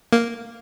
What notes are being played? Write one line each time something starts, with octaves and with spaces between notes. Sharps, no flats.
A#3